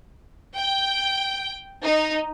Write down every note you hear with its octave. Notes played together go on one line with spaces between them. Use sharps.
G5
D#4